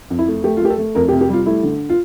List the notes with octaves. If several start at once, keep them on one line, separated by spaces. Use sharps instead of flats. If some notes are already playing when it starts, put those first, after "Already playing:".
F2
E4
A3
A3 G4
F4
A3 G4
A4
A3
F2 A#4
G4
C3
G4
G3 F4
A3 E4
D3
F4